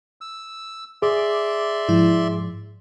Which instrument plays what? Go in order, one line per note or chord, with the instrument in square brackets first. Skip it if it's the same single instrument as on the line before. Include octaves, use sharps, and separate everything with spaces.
[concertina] E6
[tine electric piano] G#4 [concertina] D5 E5 C6 [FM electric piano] D6
[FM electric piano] G#2 F3 E4